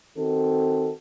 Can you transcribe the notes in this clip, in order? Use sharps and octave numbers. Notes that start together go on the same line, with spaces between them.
D#3 C4 F#4 A4